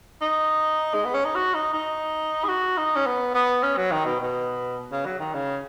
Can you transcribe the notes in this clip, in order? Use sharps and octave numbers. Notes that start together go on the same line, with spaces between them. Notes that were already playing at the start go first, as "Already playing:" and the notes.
D#4
G#3
B3
C#4
D#4
F#4
D#4
D#4
G#4
F#4
D#4
C#4
B3
B3
C#4
F#3
D#3
B2
B2
C#3
F#3
D#3
C#3